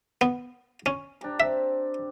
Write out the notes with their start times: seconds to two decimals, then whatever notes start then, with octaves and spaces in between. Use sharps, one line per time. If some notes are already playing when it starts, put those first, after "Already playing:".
0.21 B3
0.86 C#4
1.21 D4 G4 A#5
1.40 C4 E5